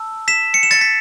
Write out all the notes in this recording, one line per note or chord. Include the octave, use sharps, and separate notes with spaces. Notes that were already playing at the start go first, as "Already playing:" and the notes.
Already playing: A5 E6
B6 E7
C#7
E7
A6 C#7
B6